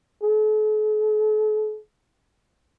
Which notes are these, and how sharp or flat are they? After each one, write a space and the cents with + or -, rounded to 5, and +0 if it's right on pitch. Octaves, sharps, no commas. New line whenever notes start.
A4 -45